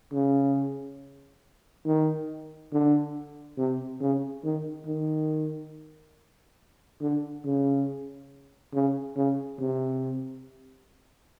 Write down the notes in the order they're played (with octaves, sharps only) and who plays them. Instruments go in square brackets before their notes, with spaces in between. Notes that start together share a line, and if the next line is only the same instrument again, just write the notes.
[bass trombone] C#3
D#3
D3
C3
C#3
D#3
D#3
D3
C#3
C#3
C#3
C3